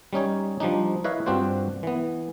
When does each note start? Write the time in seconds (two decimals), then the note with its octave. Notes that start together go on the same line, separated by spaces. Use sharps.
0.13 G3 C#4 D#4 C#5
0.60 F3 G3 D4 D#4
1.04 E4 B4 C#5 D#5 F5
1.26 G2 C4 D4 F4 F#4 C5
1.83 E3 B3